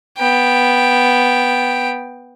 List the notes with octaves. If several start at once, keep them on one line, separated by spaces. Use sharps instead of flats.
B3 G5